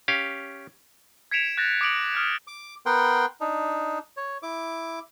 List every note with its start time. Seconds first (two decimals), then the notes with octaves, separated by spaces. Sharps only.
0.08 C#4 G4 F5
1.31 G#6 B6 C#7 D7 E7 F7
1.58 F#6 G6 A6 A#6
1.81 D6 D#6 C#7 D7 F7 F#7
2.15 D#6 F6 F#6
2.47 D6
2.86 B3 A#4 F#5 G5 C6
3.41 D4 D#4
4.17 C#5
4.43 E4 D6